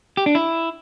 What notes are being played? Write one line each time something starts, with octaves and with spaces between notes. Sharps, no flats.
G4
D4
E4